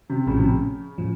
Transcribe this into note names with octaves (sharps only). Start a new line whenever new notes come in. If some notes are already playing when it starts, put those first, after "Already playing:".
C3
A#1 A2 C#3 F3
C3
C#3
A2 F3